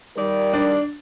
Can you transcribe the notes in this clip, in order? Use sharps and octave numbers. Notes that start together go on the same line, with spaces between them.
D#3 G3 A#4 D5
D4